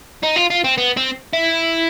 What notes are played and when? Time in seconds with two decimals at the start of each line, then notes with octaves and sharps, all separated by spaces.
0.23 D#4
0.36 F4
0.50 F4
0.64 C4
0.78 B3
0.97 C4
1.33 E4